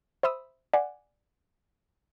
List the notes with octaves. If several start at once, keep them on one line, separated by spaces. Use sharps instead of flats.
C5 E5 B5 D#6 E6
D5 F#5 G#5